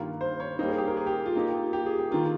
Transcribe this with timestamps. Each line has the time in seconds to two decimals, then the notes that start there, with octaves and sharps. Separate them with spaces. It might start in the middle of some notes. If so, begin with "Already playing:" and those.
Already playing: G2 D#3 A#3 F4
0.21 C5
0.40 C#5
0.59 G3 A#3 D#4 C5
0.68 G#4
0.78 G4
0.88 A#4
0.97 G#4
1.07 G4
1.26 F4
1.35 A#3 D#4 G4
1.73 G4
1.86 G#4
1.99 G4
2.11 D#3 A#3 F4